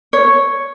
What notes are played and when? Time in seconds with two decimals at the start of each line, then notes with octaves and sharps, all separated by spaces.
0.13 C#5